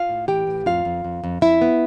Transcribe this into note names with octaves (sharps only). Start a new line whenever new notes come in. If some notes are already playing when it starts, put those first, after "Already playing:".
Already playing: F4 F5
A2
E3 G4 G5
A2
F2 F4 F5
F2
F2
F2
F2 E4 E5
B3